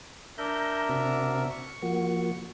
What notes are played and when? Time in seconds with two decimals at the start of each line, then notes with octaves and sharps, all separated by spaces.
0.38 D4 A#4 E5 A#5 G6
0.89 C3 C4 F#4
1.50 C#6
1.82 F3 A#3 F#4